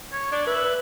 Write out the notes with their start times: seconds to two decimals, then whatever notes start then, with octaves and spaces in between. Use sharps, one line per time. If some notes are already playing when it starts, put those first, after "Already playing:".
0.12 C#5
0.32 D4 D5
0.47 B4 E5